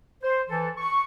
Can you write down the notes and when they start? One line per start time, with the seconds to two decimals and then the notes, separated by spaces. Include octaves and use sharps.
0.23 C5
0.49 E3 A4
0.77 C#6